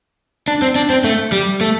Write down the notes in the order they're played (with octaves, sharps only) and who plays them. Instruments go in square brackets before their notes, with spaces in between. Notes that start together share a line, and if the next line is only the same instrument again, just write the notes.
[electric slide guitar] D4
C4
D4
C4
A3
G3
A3